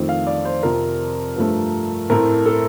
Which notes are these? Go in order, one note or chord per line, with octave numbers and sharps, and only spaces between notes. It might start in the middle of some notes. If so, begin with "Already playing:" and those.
Already playing: F2 D#3 A3
F5
D5
C5
F2 C3 F3 C4 A#4
G2 F3 A3
A2 A3 C4 A#4
A4